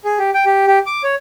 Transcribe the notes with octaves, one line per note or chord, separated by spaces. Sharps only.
G#4
G4
G5
G4
G4
D6
C#5